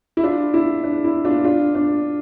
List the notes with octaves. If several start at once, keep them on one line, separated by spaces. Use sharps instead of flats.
E4
D4 F4
E4
D4
E4
D4 F4
D4 F4
D4